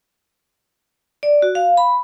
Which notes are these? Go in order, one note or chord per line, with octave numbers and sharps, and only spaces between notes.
D5
F#4
F5
B5